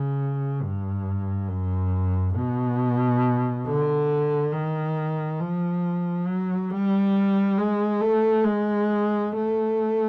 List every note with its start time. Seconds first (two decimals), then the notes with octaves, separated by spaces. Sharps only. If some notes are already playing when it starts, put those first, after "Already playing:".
Already playing: C#3
0.62 G2
1.49 F#2
2.35 B2
3.66 D3
4.53 D#3
5.40 F3
6.27 F#3
6.71 G3
7.58 G#3
8.00 A3
8.44 G#3
9.32 A3